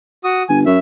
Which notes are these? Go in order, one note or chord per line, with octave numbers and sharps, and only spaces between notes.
F#4 D#6
G1 G#5
F#2 E5